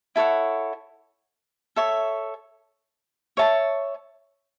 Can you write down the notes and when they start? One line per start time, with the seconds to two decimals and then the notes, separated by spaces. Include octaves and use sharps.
0.16 E4 A4 C#5 F#5
1.76 A4 C#5 E5
3.37 C#5 E5 A5